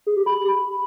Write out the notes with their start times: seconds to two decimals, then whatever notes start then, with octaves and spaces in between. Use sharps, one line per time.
0.07 G#4
0.16 G4
0.26 B5